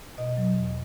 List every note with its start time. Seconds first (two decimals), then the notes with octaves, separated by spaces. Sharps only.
0.18 B2 D#5
0.37 F#3
0.56 E2